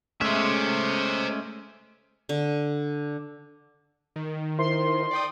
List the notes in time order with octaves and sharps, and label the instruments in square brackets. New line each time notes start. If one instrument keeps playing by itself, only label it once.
[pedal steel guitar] G#3 A3 C#4 [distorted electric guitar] C5 E5
[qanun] D3
[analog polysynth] D#3
[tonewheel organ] E4 A#4 C5 [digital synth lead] C6
[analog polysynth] D5 G5 D#6